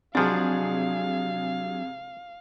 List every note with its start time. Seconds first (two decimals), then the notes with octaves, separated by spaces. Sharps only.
0.15 G#2 C3 F3 F#3 D4 G#4 F5